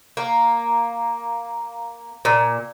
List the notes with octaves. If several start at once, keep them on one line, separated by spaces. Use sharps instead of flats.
A#3
A#2